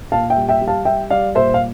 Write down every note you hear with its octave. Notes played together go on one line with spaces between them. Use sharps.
A#2 F5 A5
E5 G5
G3
E5 G5
G3
F5 A5
G3 E5 G5
G3 D5 F5
A#2 C5 E5
F5